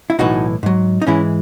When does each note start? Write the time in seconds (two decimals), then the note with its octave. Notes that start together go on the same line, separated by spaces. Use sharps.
0.10 E4
0.19 B1 A2 E3 D#4 F#4
0.63 G#2 F#3
1.02 D#4
1.07 G#2 E3 G#3 C#4 E4